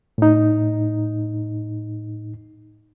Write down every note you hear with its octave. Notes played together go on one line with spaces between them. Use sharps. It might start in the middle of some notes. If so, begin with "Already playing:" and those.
A2 D#4